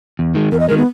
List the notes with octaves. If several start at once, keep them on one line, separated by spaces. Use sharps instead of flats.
E2
D#3 G#3
E2 A#4
D#5
D#3 G#3 A#4
B3